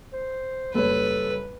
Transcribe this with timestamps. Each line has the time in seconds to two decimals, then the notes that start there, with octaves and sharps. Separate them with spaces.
0.13 C5
0.74 F#1 G3 A4 B4 C#5